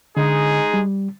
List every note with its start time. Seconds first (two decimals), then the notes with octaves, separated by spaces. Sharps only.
0.17 D3 G#3 D#4 G#4
0.74 G3